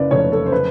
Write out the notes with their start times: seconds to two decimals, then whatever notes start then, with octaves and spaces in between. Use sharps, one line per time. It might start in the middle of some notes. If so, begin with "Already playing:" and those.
Already playing: F#1 C#3 B4 D5
0.11 F1 C#5
0.32 A4
0.46 C5
0.52 B4